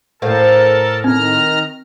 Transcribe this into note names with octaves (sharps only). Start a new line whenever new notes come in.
A2 A4 A#4 C5 F5 A5
D#3 C4 A#5 F6